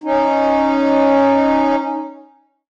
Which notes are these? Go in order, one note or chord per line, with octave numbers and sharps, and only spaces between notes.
C#4 D#4